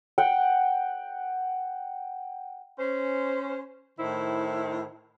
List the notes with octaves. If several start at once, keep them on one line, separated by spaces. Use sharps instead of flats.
F#5 G5
C#4 C5
A2 D#3 E4 C5